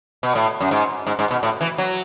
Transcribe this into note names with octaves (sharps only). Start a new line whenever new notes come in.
B2
A2
F#2
G#2
G#2
G#2
B2
A2
E3
F#3